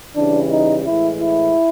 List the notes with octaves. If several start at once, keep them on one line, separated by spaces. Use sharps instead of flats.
C#3 E3 G3 D4
D#4
A2 E3 G#3 E4
E4